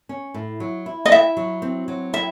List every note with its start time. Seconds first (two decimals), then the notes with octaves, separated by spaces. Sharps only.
0.09 C#4
0.34 A2
0.60 F#3
0.86 E4
1.06 D#5
1.11 E4 E5
1.37 F#3
1.62 C4
1.88 F#3
2.13 E4 E5